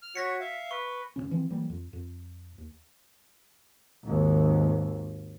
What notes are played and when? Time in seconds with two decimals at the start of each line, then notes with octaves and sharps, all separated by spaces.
0.02 F6
0.15 F#4 C#5 A#6 B6 C#7
0.41 E5 F5
0.71 B4 C#6
1.16 F1 E2 C#3 C#4
1.31 E3 F3 C4
1.50 E3 F#3 G3 A#3
1.70 F2
1.93 F2
2.58 D#2
4.03 G#1 D#2